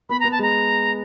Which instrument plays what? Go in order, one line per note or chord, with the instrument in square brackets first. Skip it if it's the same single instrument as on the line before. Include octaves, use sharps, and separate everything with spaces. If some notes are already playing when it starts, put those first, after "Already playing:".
[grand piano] B3 [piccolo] B5
[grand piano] B3 [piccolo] A#5
[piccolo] A5
[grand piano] G#3 [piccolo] A#5